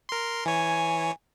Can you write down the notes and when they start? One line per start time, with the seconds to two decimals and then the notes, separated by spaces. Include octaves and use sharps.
0.09 A#4 C6
0.45 E3 C#5 G#5